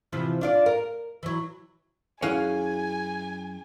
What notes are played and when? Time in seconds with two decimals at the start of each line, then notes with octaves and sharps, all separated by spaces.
0.12 C3 E3 F3
0.41 D4 F4 D5
0.66 A#4
1.23 E3 F#3
2.22 F#2 C#4 E4 G#4 F5 F#5 G#5